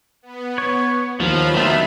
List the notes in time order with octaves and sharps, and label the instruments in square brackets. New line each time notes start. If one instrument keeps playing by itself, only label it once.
[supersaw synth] B3
[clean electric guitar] C#5
[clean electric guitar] D#2 [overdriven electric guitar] F3 [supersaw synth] F#3 B5
[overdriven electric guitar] D3 A3 [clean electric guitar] D#3 B3 F4